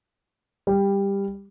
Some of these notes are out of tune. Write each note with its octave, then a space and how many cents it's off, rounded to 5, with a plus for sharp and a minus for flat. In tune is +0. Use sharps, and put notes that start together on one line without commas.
G3 +15